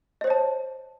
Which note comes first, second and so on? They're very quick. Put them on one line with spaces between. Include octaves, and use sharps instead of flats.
D#5 C5 C#5 A5